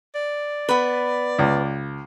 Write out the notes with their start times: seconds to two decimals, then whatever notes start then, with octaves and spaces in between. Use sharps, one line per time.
0.15 D5
0.69 B3 B4
1.39 C#2